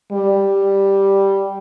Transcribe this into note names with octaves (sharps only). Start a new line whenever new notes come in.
G3